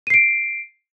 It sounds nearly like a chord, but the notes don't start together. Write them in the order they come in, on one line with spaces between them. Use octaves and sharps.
D#7 C7 D7